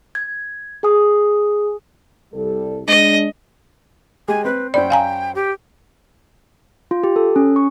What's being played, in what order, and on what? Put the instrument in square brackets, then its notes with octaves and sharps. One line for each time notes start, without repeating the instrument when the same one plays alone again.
[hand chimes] G#6
G#4 G#5 D#6
[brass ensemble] C2 G3 A4
[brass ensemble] G#3 D4 [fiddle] D#5
[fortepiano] G#3 G4 [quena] G#5
[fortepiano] C4 [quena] B4
[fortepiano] F#2 C5 B5 [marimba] D5 [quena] G5
[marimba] F5 G#5 A#5
[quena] G4
[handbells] F4
G4
A4
C#4
C#6